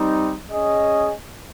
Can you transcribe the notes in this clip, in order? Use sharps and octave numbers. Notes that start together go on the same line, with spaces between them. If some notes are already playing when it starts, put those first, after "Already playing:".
Already playing: G3 C4 D#4
C#4 G#4 D#5